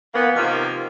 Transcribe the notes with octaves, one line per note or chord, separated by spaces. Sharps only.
E3 A#3 B3
C3 D#3 F3 A#3 F4